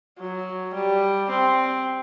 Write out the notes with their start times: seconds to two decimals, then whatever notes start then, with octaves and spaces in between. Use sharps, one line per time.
0.19 F#3
0.74 G3
1.30 C4